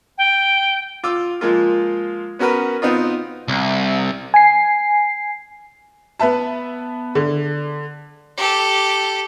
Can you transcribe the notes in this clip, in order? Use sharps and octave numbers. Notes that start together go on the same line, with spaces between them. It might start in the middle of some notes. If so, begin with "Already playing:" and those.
G5
F4 D6 E6
F3 G#3 A#3 F4
B3 C#4 F#4 A#4 B4
B3 C4 D#4 F4
C2
G#5 C7
B3 B4 E5 A5
D3
G4 A4